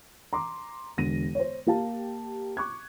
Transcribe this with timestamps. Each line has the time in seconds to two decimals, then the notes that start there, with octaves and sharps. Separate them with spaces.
0.33 A#5 C6 D6
0.97 E1 D3 A#6 D#7
1.35 C5 C#5
1.67 A#3 G4 F5 A5
2.57 C#6 D6 F#6 G#6